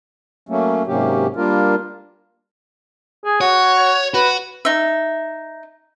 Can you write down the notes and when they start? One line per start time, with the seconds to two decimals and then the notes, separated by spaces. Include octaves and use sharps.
0.49 F#3 A3 A#3 C#4
0.87 G#2 C3 F#3 A#3 C#4 G4
1.36 G3 A#3 D4 F4 A#4
3.25 G#4
3.41 F#4 C#5
4.14 F#4 B4
4.65 D#4 E5